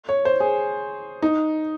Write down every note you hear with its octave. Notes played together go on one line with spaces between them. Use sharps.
C#5
C5
G#4
D#4